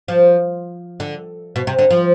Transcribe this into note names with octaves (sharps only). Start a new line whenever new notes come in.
F3
D3
B2
C3
D3
F3